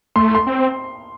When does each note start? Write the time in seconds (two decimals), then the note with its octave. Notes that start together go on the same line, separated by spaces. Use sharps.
0.16 A3 C6
0.35 C6
0.47 C4